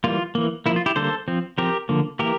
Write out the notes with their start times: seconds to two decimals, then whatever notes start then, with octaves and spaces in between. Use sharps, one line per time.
0.04 E3 G3 A#3 F4
0.35 E3 A#3
0.66 F3 A#3 E4
0.76 F4
0.86 E4 G4
0.96 D3 G3 A#3 A4 C5
1.28 F3 C4
1.58 F3 C4 G4 A#4
1.89 D3 F3 A#3
2.19 E3 A#3 G4 A#4